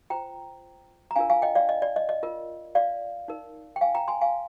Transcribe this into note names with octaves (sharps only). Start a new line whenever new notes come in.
F4 C5 G5 A#5
A#5
D4 F4 A#4 F5 G#5
F5 G#5
D#5 G5
D5 F5
D#5
D5
D#5
D#5
F4 A#4
D5 F5
D#4 A#4
G5
F5 G#5
G5 A#5
G#5 C6
F5 G#5